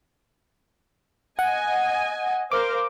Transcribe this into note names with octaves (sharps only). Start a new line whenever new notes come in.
D#5 F#5 G#5
A#4 C5 F5 D6